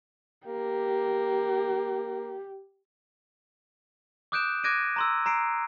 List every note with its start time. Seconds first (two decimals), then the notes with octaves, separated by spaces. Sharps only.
0.47 A#3 G4
4.32 D6 D#6 F#6 G6 D7 E7
4.64 D6 F#6 G#6 A#6 D7 D#7
4.96 A#5 C6 E6
5.26 A#5 C7 D7